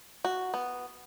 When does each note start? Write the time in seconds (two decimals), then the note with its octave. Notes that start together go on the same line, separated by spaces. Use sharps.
0.24 F#4
0.54 B3